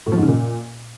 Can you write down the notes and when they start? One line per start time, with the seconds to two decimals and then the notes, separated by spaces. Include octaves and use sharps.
0.06 A2
0.12 F3
0.17 G#2
0.23 C#3
0.28 A#2